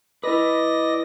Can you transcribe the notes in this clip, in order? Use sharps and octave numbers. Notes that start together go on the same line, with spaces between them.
E4 B4 D5 D#5 A#6